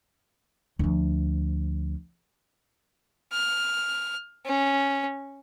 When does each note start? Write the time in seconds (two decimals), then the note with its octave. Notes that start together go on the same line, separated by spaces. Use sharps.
0.79 D2 F3
3.33 F6
4.46 C#4